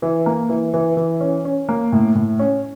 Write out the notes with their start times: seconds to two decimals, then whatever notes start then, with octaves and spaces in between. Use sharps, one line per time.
0.02 E3
0.26 A#3
0.49 E3
0.74 E3
0.97 E3
1.21 C#4
1.45 C#4
1.69 A#3
1.92 A2
2.15 A2
2.39 C#4